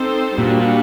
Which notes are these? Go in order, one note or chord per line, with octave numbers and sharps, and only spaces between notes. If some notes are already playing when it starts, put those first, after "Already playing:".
Already playing: C4 D#4 A4 C5
A#2 G3 D4 F#4